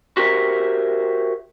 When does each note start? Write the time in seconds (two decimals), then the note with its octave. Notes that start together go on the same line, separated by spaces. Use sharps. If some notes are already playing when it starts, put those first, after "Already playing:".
0.17 F#4 G4 A#4 C5 E5